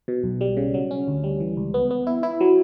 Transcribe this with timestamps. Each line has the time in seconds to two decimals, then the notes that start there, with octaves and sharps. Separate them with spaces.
0.08 B2
0.24 B1
0.41 G3
0.57 C#3
0.74 F#3
0.91 C#4
1.08 D2
1.24 G3
1.40 E3
1.57 C#2
1.74 B3
1.90 B3
2.07 E4
2.23 E4
2.41 F#3